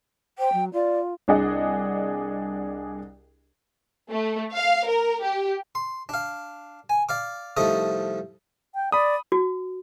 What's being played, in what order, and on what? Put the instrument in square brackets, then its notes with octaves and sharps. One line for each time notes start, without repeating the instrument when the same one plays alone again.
[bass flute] C5 [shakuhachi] G5
[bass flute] F#3
[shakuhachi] F4 [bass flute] D5
[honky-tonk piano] C2 D4 G#4 D5 D#5 F#5
[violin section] A3
F5
A#4
G4
[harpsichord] C6
D4 F5
G#5
D5 F5 D6
C2 F3 A3 D#4 D#5
[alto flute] G5
[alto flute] D5 [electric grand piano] B5 D#6
[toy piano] F#4